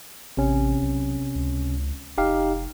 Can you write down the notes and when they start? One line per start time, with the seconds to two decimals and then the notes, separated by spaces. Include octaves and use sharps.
0.37 A1 C3 C#4
0.82 B1
1.35 C#2
2.18 F1 D#4 G4 F5